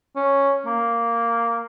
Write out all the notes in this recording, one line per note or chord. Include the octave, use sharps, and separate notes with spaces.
C#4
A#3